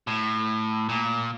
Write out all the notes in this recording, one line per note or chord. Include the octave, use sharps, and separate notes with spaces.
A2
A#2